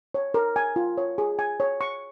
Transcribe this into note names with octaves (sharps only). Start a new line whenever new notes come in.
C#5
A#4
G#5
F4
C#5
G#4
G#5
C#5
C#6